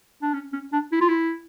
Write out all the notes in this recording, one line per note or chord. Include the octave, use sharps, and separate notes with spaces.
D4
C#4
C#4
D4
E4
F4
E4